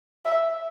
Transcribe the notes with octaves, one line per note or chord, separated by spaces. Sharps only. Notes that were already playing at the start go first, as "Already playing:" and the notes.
E5